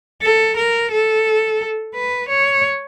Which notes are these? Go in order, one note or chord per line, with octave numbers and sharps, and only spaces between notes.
A4
A#4
A4
B4
C#5